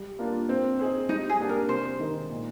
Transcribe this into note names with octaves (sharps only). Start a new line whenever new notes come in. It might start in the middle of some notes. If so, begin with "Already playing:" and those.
Already playing: G3
A#3 D4 F4
C4
D#4 G#4 C5
G3 D#4
G#4
A#3 D4 G4
A#4
C3 C5
D#3 G#3 D#4 A#4
A#2